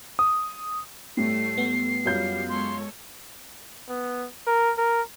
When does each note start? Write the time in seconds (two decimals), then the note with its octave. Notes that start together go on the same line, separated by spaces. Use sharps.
0.19 D#6
1.17 A2 G3 A3 C7
1.58 B3
2.06 F#2 G3 F4 G6
2.48 G#3 A4 C#5 C6
3.89 B3
4.47 A#4
4.78 A#4